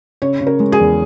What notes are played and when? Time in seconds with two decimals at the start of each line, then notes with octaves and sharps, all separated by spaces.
0.22 C#3 C#5
0.41 C#3
0.47 A#4
0.60 G#3
0.72 G#4
0.80 E2